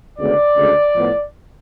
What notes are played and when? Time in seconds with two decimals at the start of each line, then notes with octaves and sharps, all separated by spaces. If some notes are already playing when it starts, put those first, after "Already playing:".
0.18 D2 C#3 G#3 B3 D5
0.57 D2 C#3 G#3
0.95 A2 F3 B3